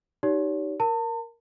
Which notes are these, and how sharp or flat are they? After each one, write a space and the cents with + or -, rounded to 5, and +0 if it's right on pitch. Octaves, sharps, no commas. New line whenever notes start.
D#4 +0 G4 -25 C#5 +40
A#4 +0 A5 +40